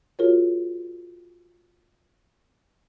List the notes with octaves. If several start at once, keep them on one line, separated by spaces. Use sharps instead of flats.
F4 F#4 G#4 A#4 C#5